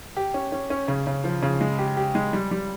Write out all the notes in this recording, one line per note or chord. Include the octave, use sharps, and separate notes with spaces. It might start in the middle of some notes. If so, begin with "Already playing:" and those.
G4
C#4
C#4
C#4
C#3
C#3
F3
C#3
G#3
G4
G4
G#3
G3
G3